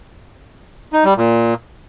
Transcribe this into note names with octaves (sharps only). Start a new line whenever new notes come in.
D#4
G3
A#2